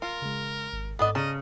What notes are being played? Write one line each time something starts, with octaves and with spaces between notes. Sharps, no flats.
F4 A#4
C#3 G#3
G#1
G#2 B3 D4 A4 D#5
C#3 D#5 A5 A#5 F6